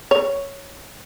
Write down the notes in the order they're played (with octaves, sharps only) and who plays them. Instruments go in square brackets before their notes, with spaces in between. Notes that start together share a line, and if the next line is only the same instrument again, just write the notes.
[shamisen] C#5